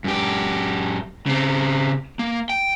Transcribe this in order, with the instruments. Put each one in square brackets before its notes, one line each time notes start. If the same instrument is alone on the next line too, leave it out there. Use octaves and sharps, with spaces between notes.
[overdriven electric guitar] F#2 G4
C#3 C4
A#3
G5